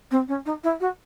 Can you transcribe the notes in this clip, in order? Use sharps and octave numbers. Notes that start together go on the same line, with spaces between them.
C4
C#4
D#4
E4
F#4